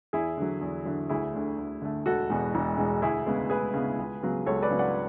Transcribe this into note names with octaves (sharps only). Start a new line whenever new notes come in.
E2 E4 G#4
D3 F#3
E2
D3 F#3
D2 E4 G#4
D3 A3
D2
D3 A3
E1 F#4 A4
E2 B2 G#3
E1
E2 B2 G#3
D2 E4 G#4
C#3 G#3 B3
D2 G#4 B4
C#3 G#3 B3
C#2
C#3 F#3 B3
C#2 A4 C#5
B4 D5
C#3 F#3 B3
D5 F#5